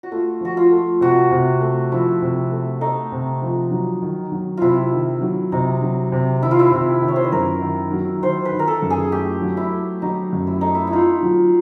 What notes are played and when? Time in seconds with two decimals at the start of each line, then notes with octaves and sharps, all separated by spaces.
0.03 F#4
0.12 A3 F4
0.41 F3 F#4
0.57 F4
0.71 A3
1.01 C3 F#4
1.31 C3
1.61 A3
1.92 F3 E4
2.22 C3
2.52 A3
2.81 A3 D#4
3.12 C3
3.42 F3
3.71 F#3
4.02 D#3
4.32 F#3
4.57 C3 E4 F4
4.93 D#3
5.21 F#3
5.52 C3 D#4
5.82 F#3
6.12 C3
6.42 D#3 E4
6.51 F4
6.59 E4
6.72 C3
7.02 D#3
7.08 C#5
7.16 C5
7.24 B4
7.32 F#2 A#4
7.62 D#3
7.92 F#3
8.22 D#3 C5
8.45 B4
8.52 D#3
8.59 A#4
8.68 A4
8.82 F#2
8.90 G#4
9.12 A3 G4
9.42 F#3
9.57 E4
9.72 A3
10.02 F#3 D#4
10.33 F#2
10.47 E4
10.61 A3 D#4
10.75 E4
10.87 E4
10.92 D#4 F4
11.23 F#3